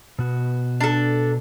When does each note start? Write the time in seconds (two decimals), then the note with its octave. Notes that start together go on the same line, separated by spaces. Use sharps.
0.19 B2 B3 F#4
0.80 D4 A4